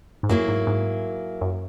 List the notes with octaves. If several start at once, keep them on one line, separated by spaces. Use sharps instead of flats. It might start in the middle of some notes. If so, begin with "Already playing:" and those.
G#2
F#2 F#3 A#3 E4 G#4
G#2
G#2
F#2